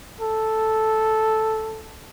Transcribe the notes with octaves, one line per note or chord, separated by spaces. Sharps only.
A4